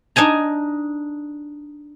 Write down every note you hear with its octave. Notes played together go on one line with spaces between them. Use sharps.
D4 D#4 G#5 A#5